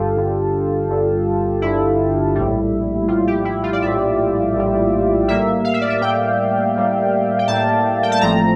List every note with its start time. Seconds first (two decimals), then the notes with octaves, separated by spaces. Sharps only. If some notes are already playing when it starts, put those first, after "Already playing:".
Already playing: G1 G2 D3 F4 G4 A4
0.16 G1 G2 D3
0.89 G1 G2 D3
1.62 G1 G2 D3 E4
2.35 A#1 A2 G3
3.08 A#1 A2 G3 F4
3.27 G4
3.45 E4
3.63 F4
3.73 D5
3.82 A#1 A2 G3 E5
4.55 A#1 A2 G3
5.28 A2 G3 A#3 E5
5.64 F5
5.74 E5
5.81 D5
5.90 E5
6.01 A2 G3 A#3 G5
6.75 A2 G3 A#3
7.39 G5
7.48 A2 G3 A#3 A5
8.03 G5
8.12 A5
8.21 A1 A2 F3 A3 C4 A#5